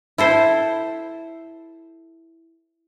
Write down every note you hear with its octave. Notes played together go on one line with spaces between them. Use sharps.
E4 A4 C5